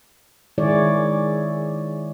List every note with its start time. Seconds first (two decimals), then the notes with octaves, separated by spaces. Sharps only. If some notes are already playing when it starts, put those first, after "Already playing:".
0.58 D#3 G#3 E4 G#4 C#5 D5